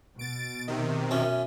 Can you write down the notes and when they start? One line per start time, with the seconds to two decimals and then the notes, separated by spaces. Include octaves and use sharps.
0.19 B2 A6 D7
0.68 C3 D#3
1.11 F#2 C#4 E5